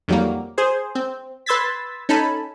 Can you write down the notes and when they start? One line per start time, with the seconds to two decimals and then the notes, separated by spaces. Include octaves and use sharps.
0.08 F2 D#3 F#3 G3 A#3
0.58 G#4 C5
0.95 C4
1.46 B4 C6 E6 G#6 A6 B6
2.09 C#4 D#4 A4 G#5 A5 B5